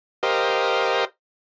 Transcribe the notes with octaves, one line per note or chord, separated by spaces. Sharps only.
G4 A#4 C5 D#5 F5